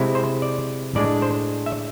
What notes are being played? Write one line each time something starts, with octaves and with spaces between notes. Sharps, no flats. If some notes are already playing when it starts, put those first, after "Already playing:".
Already playing: C3 G#3 C4 E4
C5
D5
A2 G#3 D4 D5
C5
E5